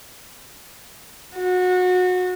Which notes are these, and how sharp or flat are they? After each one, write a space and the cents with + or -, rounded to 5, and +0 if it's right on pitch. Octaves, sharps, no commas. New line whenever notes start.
F#4 -25